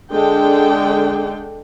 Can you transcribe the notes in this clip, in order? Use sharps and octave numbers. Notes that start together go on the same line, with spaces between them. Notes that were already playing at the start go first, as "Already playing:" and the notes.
D3 G#3 D4 A4 G5